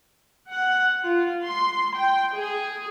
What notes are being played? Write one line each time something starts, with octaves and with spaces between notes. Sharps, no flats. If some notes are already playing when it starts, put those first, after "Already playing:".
F#5
F4
C6
G5
G#4